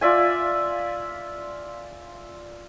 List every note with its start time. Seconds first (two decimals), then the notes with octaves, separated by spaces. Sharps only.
0.01 F4 D5 E5 G#5